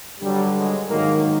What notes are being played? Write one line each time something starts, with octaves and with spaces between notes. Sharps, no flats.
G2 D3 F#3 G3
F#3 G#3
G#2 D#3 F#3 G#3 A#3